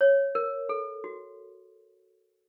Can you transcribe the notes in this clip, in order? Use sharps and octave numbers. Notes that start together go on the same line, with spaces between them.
C#5
A#4
A4
F#4